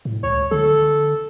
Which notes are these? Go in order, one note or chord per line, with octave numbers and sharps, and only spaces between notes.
A2
C#2 C#5
D3 A4